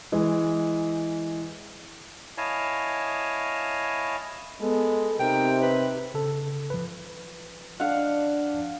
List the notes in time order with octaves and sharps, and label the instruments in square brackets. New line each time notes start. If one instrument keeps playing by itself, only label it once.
[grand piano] E3 G#3
[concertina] E4 C#5 D#5 F5 G#5 A5
[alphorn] G#3 [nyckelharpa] B3 A4
[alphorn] C3 [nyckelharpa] D#4 A#4 [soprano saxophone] G5
[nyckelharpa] G4 [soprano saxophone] B4
[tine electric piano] C#3 A4
F3 B4
[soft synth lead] D4 [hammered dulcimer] F5 F#5